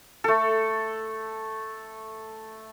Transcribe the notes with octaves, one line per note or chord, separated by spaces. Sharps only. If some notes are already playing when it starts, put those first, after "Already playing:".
A3 A4